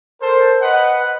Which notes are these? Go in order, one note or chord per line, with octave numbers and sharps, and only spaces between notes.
A4 A#4 C5
B4 D#5 F#5